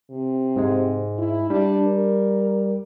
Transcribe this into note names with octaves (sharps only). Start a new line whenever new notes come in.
C3
G#2 G#3
E4
G3 D4
A#4